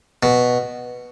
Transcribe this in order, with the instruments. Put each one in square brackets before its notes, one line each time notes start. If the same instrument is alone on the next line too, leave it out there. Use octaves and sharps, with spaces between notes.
[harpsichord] B2